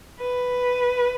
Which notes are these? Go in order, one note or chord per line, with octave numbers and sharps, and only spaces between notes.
B4